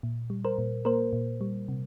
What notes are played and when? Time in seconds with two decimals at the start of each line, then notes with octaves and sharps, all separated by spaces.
0.03 A#2
0.30 G3
0.45 A#4 C5
0.58 A#2
0.85 A#3 A#4 C5
1.13 A#2
1.41 G3
1.68 C3